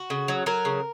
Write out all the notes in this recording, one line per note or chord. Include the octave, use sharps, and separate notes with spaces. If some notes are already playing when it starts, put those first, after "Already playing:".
Already playing: F#4
C#3
F#3
F#3 A#4
C#3